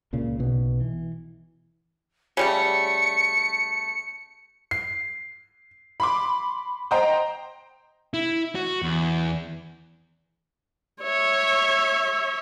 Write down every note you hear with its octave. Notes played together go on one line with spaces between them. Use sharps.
C#2 A#2 C#3
B1 B2
E3
C#3 G3 A3 C#7
C7
B5 C6 D6
C5 D#5 G5 A#5
E4
F#4
E2
C#5 E5